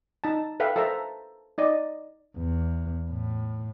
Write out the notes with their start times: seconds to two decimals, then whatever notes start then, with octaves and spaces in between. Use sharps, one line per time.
0.24 D#4 A5
0.60 A4 B4 E5 F5 G5
0.76 A4 A#4 C5 E5 A5 A#5
1.58 D#4 D5 D#5
2.37 E2
3.10 A2